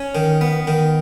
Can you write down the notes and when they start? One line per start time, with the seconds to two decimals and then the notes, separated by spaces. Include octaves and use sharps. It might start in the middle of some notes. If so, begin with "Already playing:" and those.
Already playing: C#4 C#5
0.15 D#3
0.41 B3
0.67 D#3